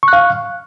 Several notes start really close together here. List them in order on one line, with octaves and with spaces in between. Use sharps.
C#6 F#6 F5